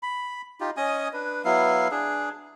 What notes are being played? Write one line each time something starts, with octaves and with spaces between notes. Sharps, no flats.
B5
D#4 F4 G4
C#4 D#5 G#5 D#6
D4 B4
F#3 B3 E4 F5
D4 G#4